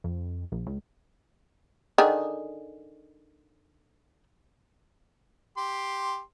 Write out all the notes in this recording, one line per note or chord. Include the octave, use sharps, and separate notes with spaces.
F2
A#1
C#2
D3 D#3 G#4
G4 C6